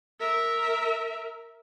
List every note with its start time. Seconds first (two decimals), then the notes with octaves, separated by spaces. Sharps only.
0.20 A#4 E5